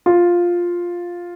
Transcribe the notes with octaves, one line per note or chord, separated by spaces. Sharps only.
F4